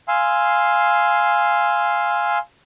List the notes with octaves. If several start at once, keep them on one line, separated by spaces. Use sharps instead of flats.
F5 G#5 C6 E6